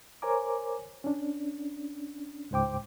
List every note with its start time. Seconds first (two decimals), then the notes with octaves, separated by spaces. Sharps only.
0.22 A#4 C5 C#5 G#5 A#5 D6
1.04 C#4 D4
2.51 C#2 G#2 C5 G5 D6